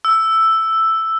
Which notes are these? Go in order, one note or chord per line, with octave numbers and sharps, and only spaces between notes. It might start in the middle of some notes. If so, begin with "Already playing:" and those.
E6